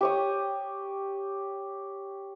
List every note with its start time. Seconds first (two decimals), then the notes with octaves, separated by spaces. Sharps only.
0.01 G4 C#5 D#6